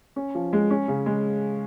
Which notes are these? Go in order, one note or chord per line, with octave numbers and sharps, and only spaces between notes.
C#4
F3
G#3
C#4
C#3
G#3